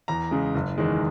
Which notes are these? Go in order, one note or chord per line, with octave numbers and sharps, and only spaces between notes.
E2 A#5
C#3 G#3
F#1
E2 D#3 G#3